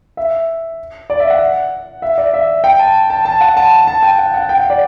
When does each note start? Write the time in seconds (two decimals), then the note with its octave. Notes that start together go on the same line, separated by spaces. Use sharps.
0.17 E5
1.10 D5
1.20 E5
1.30 F#5
2.02 E5
2.18 D5
2.34 E5
2.64 G5
2.79 A5
3.10 A5
3.25 A5
3.41 F#5
3.57 A5
3.87 A5
4.03 G5
4.18 F#5
4.34 F#5
4.49 G5
4.59 F#5
4.70 D5